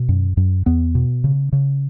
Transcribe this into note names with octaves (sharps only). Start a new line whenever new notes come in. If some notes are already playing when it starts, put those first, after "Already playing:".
Already playing: B2
F#2
F#2
E2 B3
B2
C#3
C#3